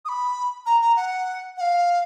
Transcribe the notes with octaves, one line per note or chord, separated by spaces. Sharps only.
D#6
B5
A#5
A#5
F#5
F#5
F5